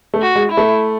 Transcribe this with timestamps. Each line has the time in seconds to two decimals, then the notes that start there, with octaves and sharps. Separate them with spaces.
0.14 A3
0.22 F#4
0.35 G#3
0.51 E4
0.57 A3